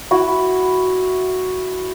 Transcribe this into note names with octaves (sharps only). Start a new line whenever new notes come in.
E4 F#4